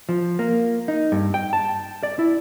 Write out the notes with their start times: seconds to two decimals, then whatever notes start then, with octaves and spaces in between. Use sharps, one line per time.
0.09 F3
0.39 A#3
0.88 D#4
1.12 G2
1.34 G5
1.53 A5
2.03 D5
2.19 E4